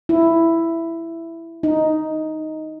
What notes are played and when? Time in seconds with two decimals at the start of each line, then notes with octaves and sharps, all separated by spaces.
0.09 E4
1.63 D#4